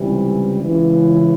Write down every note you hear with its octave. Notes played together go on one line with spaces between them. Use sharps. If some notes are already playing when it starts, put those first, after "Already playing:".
Already playing: C#2 C3 E3 G3
C#2 C#3 E3